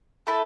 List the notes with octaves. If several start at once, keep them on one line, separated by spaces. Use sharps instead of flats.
A3 E4 A4